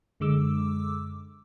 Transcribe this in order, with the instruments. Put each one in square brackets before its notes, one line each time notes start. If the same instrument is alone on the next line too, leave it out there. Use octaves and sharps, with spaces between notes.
[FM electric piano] F#2 D3 G#3 D6 E6